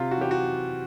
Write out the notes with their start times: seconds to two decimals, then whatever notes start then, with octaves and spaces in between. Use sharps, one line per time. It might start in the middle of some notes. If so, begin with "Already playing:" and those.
Already playing: C3 F4
0.11 F#4
0.17 E3 G4
0.31 F#4